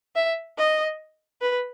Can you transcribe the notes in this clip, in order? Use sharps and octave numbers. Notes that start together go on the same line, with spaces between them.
E5
D#5
B4